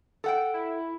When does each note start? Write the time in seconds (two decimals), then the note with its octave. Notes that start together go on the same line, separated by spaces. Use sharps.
0.24 A4 F#5 G5
0.54 E4